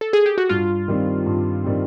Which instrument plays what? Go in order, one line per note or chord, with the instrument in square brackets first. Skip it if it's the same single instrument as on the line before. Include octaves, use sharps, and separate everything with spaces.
[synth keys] A4
G#4
G4
F#4
[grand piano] G2 [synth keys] F4
[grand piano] D#3 G3 C4
G2
D#3 G3 C4